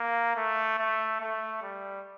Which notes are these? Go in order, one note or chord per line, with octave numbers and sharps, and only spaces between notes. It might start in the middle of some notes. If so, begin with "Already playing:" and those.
Already playing: A#3
A3
A3
A3
G3